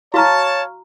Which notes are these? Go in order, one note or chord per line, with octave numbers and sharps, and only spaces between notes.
F#4 C#5 F5 A5 A#5 C#6 F6